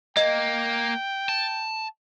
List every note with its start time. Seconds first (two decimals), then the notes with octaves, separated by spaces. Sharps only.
0.17 A#3 D#5 G5
1.29 A5